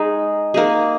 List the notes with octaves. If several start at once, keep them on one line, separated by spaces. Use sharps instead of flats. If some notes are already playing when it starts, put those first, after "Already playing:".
Already playing: G#3 D#4 G#4
A#3 D#4 G#4